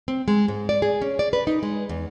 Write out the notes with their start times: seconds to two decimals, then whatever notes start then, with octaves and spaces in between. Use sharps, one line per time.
0.08 C4
0.28 G#3
0.48 G#2
0.69 D5
0.82 G#4
1.02 C#4
1.19 D5
1.33 B4
1.47 D#4
1.63 G#3
1.89 E2